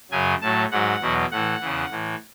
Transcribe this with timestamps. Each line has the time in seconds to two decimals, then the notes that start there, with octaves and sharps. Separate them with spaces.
0.11 F#2 C#3 F#3 G#5
0.41 A2 F#3 A5
0.71 G#2 F#3 F#5
1.00 E2 B2 F#3
1.31 A2 E3 F#5
1.61 E2 C#3 E3
1.91 A2 E3